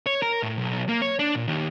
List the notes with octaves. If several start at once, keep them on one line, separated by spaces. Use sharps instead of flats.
C#5
A#4
A2
B1
A#3
C#5
D4
A#2
D#2